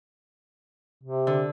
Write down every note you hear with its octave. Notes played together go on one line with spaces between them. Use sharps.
C3
D3